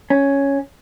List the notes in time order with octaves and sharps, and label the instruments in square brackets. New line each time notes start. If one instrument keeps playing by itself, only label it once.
[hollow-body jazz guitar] C#4